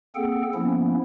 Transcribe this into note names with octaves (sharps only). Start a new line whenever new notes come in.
A#3 C4 G#4 A4 F#5 G5
F3 A#3 B3 C#4 E4